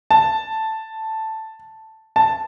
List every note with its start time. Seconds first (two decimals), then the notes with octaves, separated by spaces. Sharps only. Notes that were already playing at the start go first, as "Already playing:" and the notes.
0.11 A5
2.16 A5